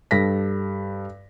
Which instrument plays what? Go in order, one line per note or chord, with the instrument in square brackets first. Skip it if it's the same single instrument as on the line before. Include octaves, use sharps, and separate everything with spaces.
[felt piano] G2 A4 A#6 B6